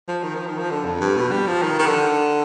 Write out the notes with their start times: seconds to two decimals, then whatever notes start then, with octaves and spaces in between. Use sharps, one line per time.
0.08 F3
0.23 D#3
0.35 F3
0.47 D#3
0.59 F3
0.71 D3
0.85 F2
1.01 G2
1.17 B2
1.32 G3
1.47 F3
1.62 D#3
1.79 D#3
1.86 D3